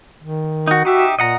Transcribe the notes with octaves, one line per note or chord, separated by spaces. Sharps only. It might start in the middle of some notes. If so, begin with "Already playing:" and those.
D#3
D#4 F#4
D#4 F#4 G4 E5
A#2 D#5 F#5 A#5